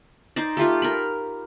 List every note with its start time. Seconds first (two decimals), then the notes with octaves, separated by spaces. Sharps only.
0.36 D#4 C5 D5
0.57 A3 F4 G4 A4
0.82 A#4 G5 B5